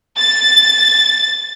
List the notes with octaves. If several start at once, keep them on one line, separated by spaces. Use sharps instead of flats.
A6